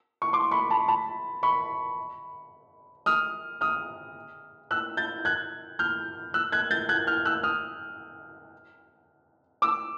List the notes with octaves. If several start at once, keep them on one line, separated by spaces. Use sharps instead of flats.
C#6
C6 D6
B5 C#6
A5 B5
A5 B5
B5 C#6
D#6 F6
D#6 F6
E6 F#6
G6 A6
F#6 G#6
F6 G6
E6 F#6
F#6 G#6
G6 A6
F#6 G#6
F6 G6
E6 F#6
D#6 F6
D6 E6